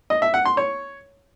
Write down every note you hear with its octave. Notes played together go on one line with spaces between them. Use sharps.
D#5
E5
F#5
C6
C#5